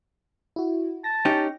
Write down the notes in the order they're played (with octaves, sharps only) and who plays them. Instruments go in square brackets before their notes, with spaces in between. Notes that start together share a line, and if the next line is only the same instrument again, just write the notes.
[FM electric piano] E4 F#4
[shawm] A5 [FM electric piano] A#6
[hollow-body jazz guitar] C#4 D#4 G4